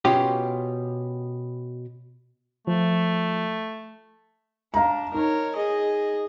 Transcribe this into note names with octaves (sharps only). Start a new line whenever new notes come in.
B2 C#4 F4 G4
F3 A3
D4 F5 A#5
D#4 A#4 C#5
G#4 D#5